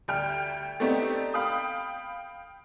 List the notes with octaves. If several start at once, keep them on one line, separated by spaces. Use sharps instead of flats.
D2 G3 G5 F6
A3 B3 C4 D4 D#4 G4
F5 G5 B5 D#6